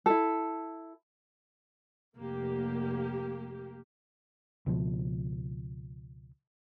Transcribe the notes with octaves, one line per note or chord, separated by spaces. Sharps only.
E4 A4
F1 A#3 G4
C#2 B2 F3